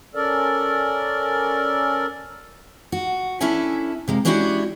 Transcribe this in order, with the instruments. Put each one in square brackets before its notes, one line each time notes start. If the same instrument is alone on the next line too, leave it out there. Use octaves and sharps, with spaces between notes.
[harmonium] C#4 A4 A#4 D5
[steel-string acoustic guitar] F#4
C#4 D4 E4 A4 E5 G#5
C3 G#3 A#3
G#3 C#4 D4 E4 F#4 G4